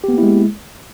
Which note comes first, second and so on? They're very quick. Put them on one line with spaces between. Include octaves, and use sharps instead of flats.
G4 B3 A#3 E4 G#3